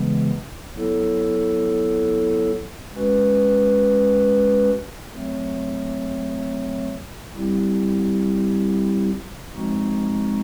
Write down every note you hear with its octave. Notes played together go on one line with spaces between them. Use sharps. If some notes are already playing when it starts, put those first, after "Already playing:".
Already playing: C#3 E3 G#3 B3
F#3 B3 E4 A4
G#3 C#4 F#4 B4
F#3 A3 C4
G3 C4 E4 G4
F3 G#3 C4 D#4 F#4